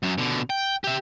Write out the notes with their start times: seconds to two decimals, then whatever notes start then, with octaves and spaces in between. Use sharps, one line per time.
0.03 F#2 F#3
0.18 B2 D3
0.50 G5
0.84 G4 E5